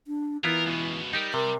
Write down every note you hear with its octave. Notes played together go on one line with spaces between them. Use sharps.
D4
E3 B3 E4 F4 A#4
C#2 B2
G3 D#4 G4 A#4
C3 A#4